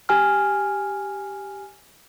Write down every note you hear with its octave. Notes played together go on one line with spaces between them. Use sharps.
G4 G#5 F6